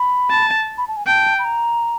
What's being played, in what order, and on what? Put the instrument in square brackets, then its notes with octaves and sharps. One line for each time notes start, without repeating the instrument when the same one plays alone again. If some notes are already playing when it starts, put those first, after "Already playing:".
Already playing: [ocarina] B5
[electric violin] A5
[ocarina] B5
A5
G#5
[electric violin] G5 [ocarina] A5
[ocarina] B5
A#5